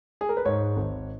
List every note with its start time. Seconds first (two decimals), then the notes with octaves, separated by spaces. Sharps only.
0.21 G#4
0.29 A#4
0.37 B4
0.45 G#2 C#5
0.76 G#1